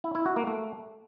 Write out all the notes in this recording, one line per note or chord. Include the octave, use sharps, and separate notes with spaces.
E4
E4
F#4
A#3
A3